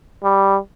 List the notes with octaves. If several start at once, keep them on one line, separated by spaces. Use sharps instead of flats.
G3